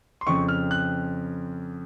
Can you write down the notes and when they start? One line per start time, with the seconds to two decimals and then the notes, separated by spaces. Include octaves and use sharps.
0.21 C6
0.27 F2 C#3 F3 C4 C#6
0.49 F6
0.71 F#6